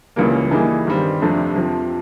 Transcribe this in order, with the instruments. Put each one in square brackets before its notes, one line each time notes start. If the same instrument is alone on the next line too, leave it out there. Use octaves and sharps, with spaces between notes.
[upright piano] C#2 C#3 E3 G3 A#3
E3 G3 A#3 D#4 G#4
G2 D#3 G3 C4
F2 C3 F3 A3 D4
F2 C3 F3